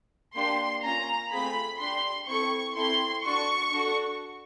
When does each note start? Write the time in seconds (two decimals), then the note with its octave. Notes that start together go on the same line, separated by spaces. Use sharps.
0.35 A#3 D4 G4 C6
0.82 A#3 C#4 F4 A#5
1.30 A3 C4 F4 G#4 B5
1.79 D4 G4 C6
2.27 C4 E4 A4 C#6
2.75 C4 E4 A4 C6
3.23 D4 F#4 A4 C#6
3.71 D4 F#4 A4